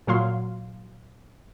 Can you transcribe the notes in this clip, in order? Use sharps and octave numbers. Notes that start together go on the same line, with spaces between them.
A#2 F#3 F5 C6